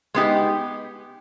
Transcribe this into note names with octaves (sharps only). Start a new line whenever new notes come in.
G#3 B3 D#4 G4